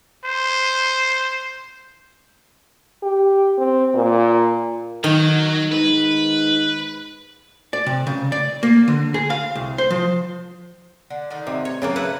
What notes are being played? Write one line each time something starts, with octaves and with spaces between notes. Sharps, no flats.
C5
G4
C4
A#2
D#3 F#3
G#2 B4
D5
C3
C#3
D5
A#3
D3
G#4
F5
C2
C5
F3
D3
D3 D#3 D#4
C3
C#5
C#3 F#3 A#3 C#5 G5 A5
E4 B4 F#5